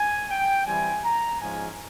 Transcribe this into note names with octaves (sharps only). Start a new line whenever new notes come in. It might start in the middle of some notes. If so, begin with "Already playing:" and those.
Already playing: G#5
G5
E3 G3 C4 E4 G#5
A#5
G#2 F3 G#3 C#4 G#5